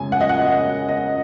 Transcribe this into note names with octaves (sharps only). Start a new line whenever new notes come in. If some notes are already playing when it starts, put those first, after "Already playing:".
Already playing: F#2 C#3 G#3 G#5
F#5
D#5
F#5
D#5